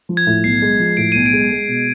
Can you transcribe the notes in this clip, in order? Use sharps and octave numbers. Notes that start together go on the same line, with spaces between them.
F3
G#6
A2
B1 C7
G#3
F3
A2 D7
B1 D#7
D7
G#3
G#3
B2